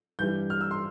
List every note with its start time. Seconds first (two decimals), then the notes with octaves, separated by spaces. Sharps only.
0.19 G2 E3 G3 G6
0.50 F6
0.61 E6
0.71 C6